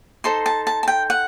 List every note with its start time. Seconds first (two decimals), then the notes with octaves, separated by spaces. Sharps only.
0.24 D#4 A4 C5 C6
0.46 A5
0.67 A5
0.83 A5
0.88 G5
1.10 F#5